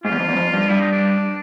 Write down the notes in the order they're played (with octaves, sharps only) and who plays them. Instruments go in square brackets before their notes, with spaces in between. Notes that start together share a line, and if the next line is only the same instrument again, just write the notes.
[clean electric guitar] G#2 [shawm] F4
[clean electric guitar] E2
F2
E2
F2
G2
[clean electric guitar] G2 [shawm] E4
[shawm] D#4
D4